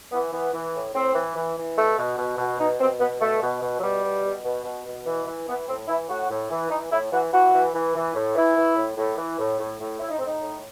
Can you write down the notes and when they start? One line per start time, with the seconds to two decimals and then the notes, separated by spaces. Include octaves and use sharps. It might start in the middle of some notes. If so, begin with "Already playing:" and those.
0.12 E3 B3
0.32 E3 B3
0.53 E3
0.74 A2
0.94 A2 C4
1.15 E3
1.36 E3
1.57 E3
1.77 B2 A3
1.97 B2
2.18 B2
2.38 B2
2.59 B2 D#4
2.80 B2 C4
3.00 B2 B3
3.20 B2 A3
3.42 B2
3.61 B2
3.78 F#3
3.82 B2 G3
4.03 B2
4.24 B2
4.44 B2
4.65 B2
4.85 B2
5.06 E3
5.27 E3
5.47 E3 B3
5.68 A2 C4
5.88 E3 E4
6.09 A2 F#4
6.30 A2
6.50 E3
6.70 E3 D#4
6.91 A2 E4
7.12 E3 F#4
7.33 E3 F#4
7.54 E3
7.74 E3
7.95 E3
8.14 A2
8.35 E3 E4
8.56 E3
8.76 A2
8.97 A2
9.17 E3
9.39 A2
9.59 A2
9.79 A2
10.00 A2 E4
10.09 D#4
10.18 A2 C4
10.26 D#4
10.41 A2